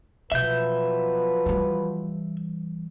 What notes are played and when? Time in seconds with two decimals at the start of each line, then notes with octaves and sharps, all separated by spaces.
0.32 B2 F3 F#3 B4 E5 G6
1.46 E3 G3